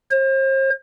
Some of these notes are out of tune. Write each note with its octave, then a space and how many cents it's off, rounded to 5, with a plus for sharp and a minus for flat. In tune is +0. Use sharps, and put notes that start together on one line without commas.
C5 +40